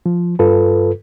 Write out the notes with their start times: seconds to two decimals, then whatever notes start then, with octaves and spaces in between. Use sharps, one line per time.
0.06 F3
0.39 G2 F4 A4 B4